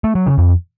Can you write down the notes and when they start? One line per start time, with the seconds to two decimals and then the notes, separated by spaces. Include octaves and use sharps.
0.04 A3
0.15 F#3
0.27 C#3
0.38 F2